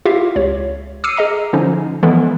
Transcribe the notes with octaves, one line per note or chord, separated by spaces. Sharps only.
E4 F4 G4 E5 F5
C#2 C#5
D6 E6 F6 C7 C#7 D#7
G#4 D#5 A#5
D3 F3 C#4 D#4
E3 F3 G#3 B3 A4